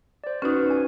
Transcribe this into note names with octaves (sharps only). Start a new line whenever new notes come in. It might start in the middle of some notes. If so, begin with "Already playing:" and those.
C5 D5
C#4 D#4 F#4 B4 F6
G#5